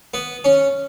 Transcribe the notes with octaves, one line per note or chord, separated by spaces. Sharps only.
B3
C#4